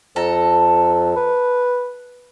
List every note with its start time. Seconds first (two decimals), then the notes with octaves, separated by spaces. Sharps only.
0.16 F2 A4 A#5
1.16 B4